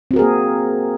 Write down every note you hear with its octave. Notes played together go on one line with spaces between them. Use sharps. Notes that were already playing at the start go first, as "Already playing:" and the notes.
A#3 C4 F#4 G#4 A#4